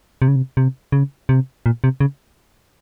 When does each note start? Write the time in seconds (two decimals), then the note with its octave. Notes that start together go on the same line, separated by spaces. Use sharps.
0.22 C3
0.28 C#3
0.36 C3
0.57 C3
0.92 C#3
1.29 C3
1.66 A#2
1.84 C3
2.00 C#3